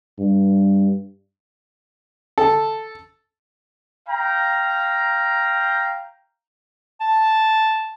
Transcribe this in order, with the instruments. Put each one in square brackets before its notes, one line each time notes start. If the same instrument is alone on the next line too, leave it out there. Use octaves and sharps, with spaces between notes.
[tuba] G2
[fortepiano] A4
[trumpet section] F5 G5 A#5
[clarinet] A5